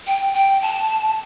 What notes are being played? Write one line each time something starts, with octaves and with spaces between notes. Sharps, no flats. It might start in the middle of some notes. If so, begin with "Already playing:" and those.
G5
G5
A5